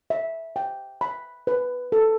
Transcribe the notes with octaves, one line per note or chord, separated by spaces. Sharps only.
E5
G5
B5
B4
A4